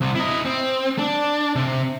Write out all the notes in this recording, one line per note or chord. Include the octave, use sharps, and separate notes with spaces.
C2 C3
E4 D#5
C4
D4
C3